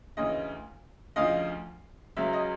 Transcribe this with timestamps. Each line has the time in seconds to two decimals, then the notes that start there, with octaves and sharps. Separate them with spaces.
0.17 D2 C#3 E3 D#5
1.16 D2 C#3 F3 D#5 F5
2.17 C#2 C#3 F#3 E5
2.33 D#5